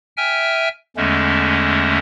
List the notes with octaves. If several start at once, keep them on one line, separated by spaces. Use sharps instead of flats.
E5 G5 G#5 F6
E2 D3 G#3 A3 C#4